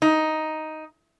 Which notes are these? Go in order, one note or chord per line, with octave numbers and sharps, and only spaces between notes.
D#4